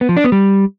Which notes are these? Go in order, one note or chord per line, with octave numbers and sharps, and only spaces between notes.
B3
F3
D4
B3
G3